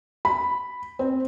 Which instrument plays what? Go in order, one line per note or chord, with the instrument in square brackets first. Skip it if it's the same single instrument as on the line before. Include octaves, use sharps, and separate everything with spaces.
[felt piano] B5
C4